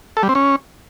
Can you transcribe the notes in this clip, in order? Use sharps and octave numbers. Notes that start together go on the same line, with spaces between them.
A4
G3
C4
C#4